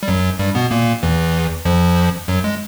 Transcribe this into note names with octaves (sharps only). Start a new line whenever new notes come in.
G3
F#2 F#3
G2 G3
B2 B3
A#2 A#3
E2 E3
F2 F3
F#2 F#3
G#3